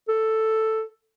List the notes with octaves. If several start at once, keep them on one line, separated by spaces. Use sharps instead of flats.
A4